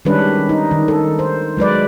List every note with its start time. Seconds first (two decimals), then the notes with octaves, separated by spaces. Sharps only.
0.05 D#3 G3 G#3 C#4 D4 B4
0.49 D#4
0.71 D#3
0.88 A4
1.19 C5
1.57 F#3 G#3 B4 D5